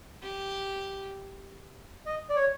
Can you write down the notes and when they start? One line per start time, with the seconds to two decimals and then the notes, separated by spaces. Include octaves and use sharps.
0.22 G4
2.06 D#5
2.29 D5
2.36 C#5